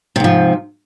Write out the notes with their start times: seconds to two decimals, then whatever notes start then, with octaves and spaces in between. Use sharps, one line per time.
0.16 C3
0.20 G#2
0.24 F3